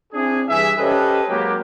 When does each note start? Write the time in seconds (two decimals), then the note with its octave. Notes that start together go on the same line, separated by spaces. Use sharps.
0.13 C4 D4 E4 G#4
0.48 G2 E3 G#4 E5
0.78 C#4 G4 A4 B4 C5 D#5
1.29 F#3 G#3 A#3 G4